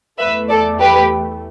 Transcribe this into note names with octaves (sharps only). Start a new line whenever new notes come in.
E2 E3 A3 B4 E5
A4 D5
G4 B4